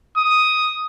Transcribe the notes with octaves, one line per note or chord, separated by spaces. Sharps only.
D#6